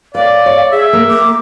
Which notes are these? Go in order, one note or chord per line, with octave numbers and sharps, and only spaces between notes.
B4 C#5 D5 F5
C#5
G#4 E5
A#3 A#4
D6